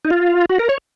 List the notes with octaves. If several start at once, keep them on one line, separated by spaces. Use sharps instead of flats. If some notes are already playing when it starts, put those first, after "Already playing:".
D#4
F4
F#4
A#4
C#5